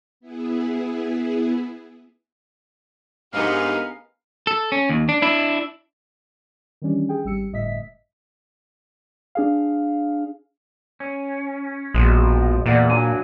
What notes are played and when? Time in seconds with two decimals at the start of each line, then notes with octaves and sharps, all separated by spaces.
0.20 B3 E4 G#4
3.34 G#2 B3 D4 D#4 G4 G#4 A#4 F5
4.47 A4
4.72 C#4
4.89 D#2
5.09 D4
5.22 D4 E4
6.82 D#3 E3 G3 C#4 D4
7.09 G#4 G5
7.25 G#1 G3 E6 C#7
7.52 G1 A2 D#5 E5 B6
9.35 D4 G#4 F5
11.00 C#4
11.94 A#1 B2 F3 G#3
12.66 E2 A#2 D5 F#5
12.89 F#3 D4 G#5